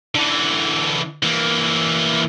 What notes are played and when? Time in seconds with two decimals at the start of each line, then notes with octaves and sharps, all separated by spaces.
0.15 D3 E3
1.23 E3 A#3